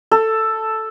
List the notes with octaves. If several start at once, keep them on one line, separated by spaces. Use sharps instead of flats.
A4